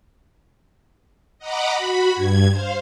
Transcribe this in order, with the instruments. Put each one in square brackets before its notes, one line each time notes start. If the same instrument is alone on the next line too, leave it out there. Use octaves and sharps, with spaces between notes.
[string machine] D#5 F#5 A#5 B5 D6
F#4 B5
G2 G#6
C5 F5